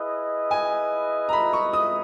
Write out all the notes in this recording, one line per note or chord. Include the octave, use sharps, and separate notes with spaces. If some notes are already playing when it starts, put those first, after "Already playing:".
Already playing: E4 G#4 B4 D#5
G#5
A#5
B5
C#6
D#6